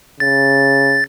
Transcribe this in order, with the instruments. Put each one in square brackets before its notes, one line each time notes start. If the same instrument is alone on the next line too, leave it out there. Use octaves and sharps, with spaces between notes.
[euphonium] C#3 [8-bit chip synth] A6